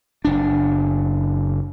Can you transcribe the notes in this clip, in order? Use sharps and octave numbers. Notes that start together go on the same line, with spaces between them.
F#1 D4